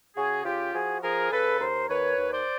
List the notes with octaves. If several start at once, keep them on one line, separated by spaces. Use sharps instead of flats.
C#3 F#4 G#4
C#3 F4 G4
F3 F#4 G#4
F3 G#4 A#4
C#3 A4 B4
D#2 A#4 C5
D#2 B4 C#5
D#2
C5 D5